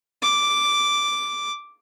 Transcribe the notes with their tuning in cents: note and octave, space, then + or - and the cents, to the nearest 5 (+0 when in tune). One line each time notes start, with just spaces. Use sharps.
D6 -5